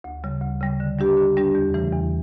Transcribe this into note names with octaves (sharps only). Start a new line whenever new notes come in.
D2
C#3 G3
D2
C#3 G3
D3
G3 D4 G4
D3
G3 D4 G4
E2
C#3 E3 A3
E2